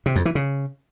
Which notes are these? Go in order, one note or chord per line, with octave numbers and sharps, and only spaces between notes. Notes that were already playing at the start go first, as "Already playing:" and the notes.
C3
F2
E3
C#3